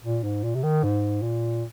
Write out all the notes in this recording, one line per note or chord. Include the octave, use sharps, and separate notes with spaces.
A#2
G#2
A#2
C3
D#3
G#2
A#2